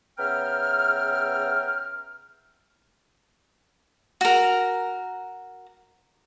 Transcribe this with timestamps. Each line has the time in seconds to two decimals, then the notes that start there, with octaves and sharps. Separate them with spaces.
0.19 C#3 B3 E5 G5 A#5 F6
4.21 F#4 A#4